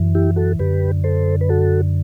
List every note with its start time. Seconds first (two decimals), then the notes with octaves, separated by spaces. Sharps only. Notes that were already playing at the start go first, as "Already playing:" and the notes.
Already playing: F#2 E3
0.15 E4 G4
0.36 F#4 A4
0.59 F#2 D3 G4 B4
1.04 A4 C5
1.41 B4
1.49 F#4 A4